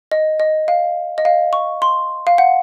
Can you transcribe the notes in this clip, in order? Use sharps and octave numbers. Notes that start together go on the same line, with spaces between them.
D#5
D#5
F5
D#5
F5
C#6
C6
F5
F#5